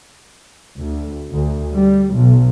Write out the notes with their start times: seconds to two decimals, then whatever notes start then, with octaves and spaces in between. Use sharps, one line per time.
0.79 D2
1.30 D2
1.73 G3
2.16 B1